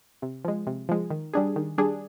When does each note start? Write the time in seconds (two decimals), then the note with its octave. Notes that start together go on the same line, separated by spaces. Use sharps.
0.22 C3
0.45 F3 G#3
0.67 C3
0.89 F3 G#3
1.10 D#3
1.34 G3 D4 G#4
1.56 D#3
1.78 G3 D4 G#4